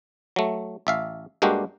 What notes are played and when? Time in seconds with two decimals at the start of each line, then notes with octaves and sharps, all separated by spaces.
0.36 F#3 A3
0.87 A1 E5 F5
1.42 G2 G#3 A#3 D4 F#4 G4